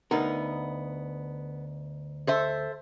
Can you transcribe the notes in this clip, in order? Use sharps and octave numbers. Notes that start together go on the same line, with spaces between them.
D2 B3 D#4 A#4
A4 C5 E5